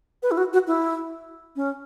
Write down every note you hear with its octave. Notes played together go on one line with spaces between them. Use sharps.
B4
E4
F#4
F#4
E4
C#4